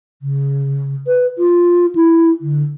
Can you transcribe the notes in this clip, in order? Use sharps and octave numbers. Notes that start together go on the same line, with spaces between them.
C#3
B4
F4
E4
D3